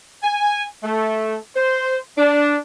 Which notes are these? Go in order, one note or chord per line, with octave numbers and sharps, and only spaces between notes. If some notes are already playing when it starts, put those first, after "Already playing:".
G#5
A3
C5
D4